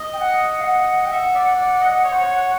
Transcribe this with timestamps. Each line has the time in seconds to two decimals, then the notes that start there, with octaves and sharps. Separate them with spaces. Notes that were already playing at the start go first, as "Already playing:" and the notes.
Already playing: D#5
0.13 G5
0.19 F#5
0.61 F5
0.66 F#5
1.05 G5
1.11 E5 F#5
1.35 D5
1.57 D5
1.81 D#5
2.04 C#5
2.12 C5
2.18 C#5